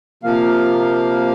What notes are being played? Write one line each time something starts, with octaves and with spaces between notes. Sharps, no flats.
C3 F3 A#3 F5